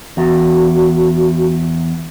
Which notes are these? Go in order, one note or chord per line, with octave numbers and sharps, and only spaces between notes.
E2 F#4